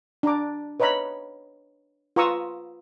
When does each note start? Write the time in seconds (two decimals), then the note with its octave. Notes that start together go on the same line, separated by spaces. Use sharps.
0.23 D4 A#5 D6
0.80 B4 C#5 D#5 A#5 B5
2.16 F4 B4 A#5 C#6 D#6 E6